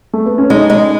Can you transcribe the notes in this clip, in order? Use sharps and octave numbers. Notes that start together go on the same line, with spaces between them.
A3
B3
C#4
G#3 D#4
G#3